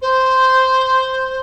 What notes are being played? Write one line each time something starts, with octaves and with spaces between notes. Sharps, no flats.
C5